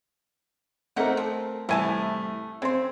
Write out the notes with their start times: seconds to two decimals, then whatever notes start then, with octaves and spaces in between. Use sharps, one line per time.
0.96 A3 A#3 C4 D#4 A#4 F#5
1.17 F3
1.69 C2 A2 E3 A3 G#5 A5
2.62 C#3 C4 C6